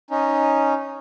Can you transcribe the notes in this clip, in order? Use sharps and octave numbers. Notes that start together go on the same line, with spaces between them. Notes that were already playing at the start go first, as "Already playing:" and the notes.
C#4 D#4